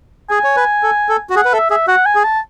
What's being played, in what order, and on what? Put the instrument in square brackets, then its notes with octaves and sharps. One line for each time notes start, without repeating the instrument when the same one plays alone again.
[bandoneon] G#4 [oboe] G#5
[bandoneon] C#5
B4
A4
A4
F#4
[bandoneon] G#4 [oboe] F#5
[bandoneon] B4
[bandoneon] A4 [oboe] E5
[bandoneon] G#4 [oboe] E5
[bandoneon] F#4 [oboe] F#5
[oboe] G#5
[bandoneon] G#4
[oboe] A5